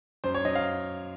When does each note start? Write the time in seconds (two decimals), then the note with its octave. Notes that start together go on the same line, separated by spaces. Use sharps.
0.24 F#2 C5
0.34 C#5
0.45 F#2 D#5
0.55 F5